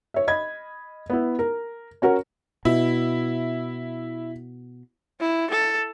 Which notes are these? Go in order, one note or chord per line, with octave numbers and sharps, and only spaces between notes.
C#5 E5
D#5 B5 G#6
B3 E4
A#4
C#4 F#4 A#4
B2 E4
E4
A4